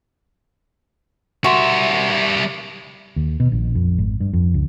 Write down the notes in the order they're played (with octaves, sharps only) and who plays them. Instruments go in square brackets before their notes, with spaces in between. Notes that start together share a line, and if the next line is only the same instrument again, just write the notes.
[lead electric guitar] G3 E5 [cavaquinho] F#4 A#4 C6
[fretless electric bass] D#2
B2
A#1
F2
G#1
G2
F2
C#2